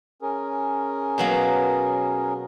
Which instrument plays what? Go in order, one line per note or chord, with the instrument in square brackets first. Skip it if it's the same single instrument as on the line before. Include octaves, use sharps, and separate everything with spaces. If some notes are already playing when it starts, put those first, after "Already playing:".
[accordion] C#4 G#4 A#4
[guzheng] B2 F#3 A#3